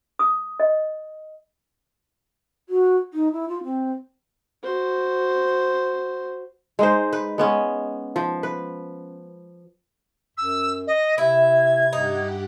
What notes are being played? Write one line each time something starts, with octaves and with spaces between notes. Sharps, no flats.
D#6
D#5
F#4
D#4
E4
F4
C4
F#4 C5
G#3 D#4 C5
B4
G#3 B3 C#4
F3
B4
F#2 E6
D#5
C3 E4 G#6
G2 D#4 G4 F#5